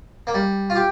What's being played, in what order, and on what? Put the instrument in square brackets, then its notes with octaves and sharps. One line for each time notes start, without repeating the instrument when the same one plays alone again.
[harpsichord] A#3
G3
F4
[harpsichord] G4 [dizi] G5